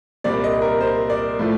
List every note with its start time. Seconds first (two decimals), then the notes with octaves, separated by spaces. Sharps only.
0.24 C2 A#2 G3 C4 D5
0.44 D#5
0.62 A#4
0.81 C5
1.10 D5
1.39 A2 F3 A3